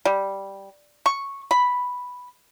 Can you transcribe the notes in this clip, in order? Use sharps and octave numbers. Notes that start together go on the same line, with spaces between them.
G3
C#6
B5